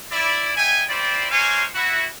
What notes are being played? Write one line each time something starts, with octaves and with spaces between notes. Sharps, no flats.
E4 D5
D#4 E5 G5 G#5
C4 E4 F4 C5 D5
G#3 A#3 C5 C#5 F5 G#5
E4 F#4